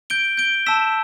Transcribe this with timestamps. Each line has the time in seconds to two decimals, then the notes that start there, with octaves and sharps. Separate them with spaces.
0.10 G6 D7 G7
0.38 G6 D7 G7
0.66 A5 E6 B6 E7